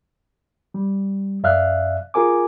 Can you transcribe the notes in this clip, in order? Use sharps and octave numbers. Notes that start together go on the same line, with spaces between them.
G3
F#2 D5 E5 F5 F6 F#6
F4 G#4 A#4 G#5 D6